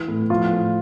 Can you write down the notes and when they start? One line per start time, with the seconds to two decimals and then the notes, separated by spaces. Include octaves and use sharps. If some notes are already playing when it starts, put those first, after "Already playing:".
Already playing: E3
0.08 A2
0.30 F3 F4
0.52 A2